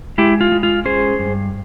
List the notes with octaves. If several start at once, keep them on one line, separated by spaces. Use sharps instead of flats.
G#3 E4 G4
F4
G#3
F4
C#4 G#4 C5
G2